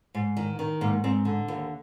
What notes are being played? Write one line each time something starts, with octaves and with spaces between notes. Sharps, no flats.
G#2
D#3
D#3
G#2 A#3
G#2 C4
D3
D#2